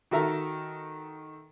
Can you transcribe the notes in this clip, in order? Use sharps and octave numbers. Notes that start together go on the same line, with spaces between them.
D#3 F#4 A4 A#4 E5 A#5